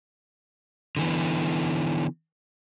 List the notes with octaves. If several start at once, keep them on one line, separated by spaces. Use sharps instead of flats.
D3 E3 B3